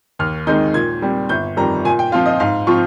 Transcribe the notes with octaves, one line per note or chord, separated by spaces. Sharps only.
D#2 F6
D#3 G#3 C4 D#4 G6
A#2 G#6
G3 C4
G1 G6
F2 D#3 G3 A#5
A#2 G#5
G5
F3 C4 F4 F5
D#5
G#2 F5
F3 C4 F4 C#6